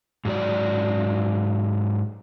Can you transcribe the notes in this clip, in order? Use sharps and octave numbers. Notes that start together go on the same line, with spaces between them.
G#2 F#3 D5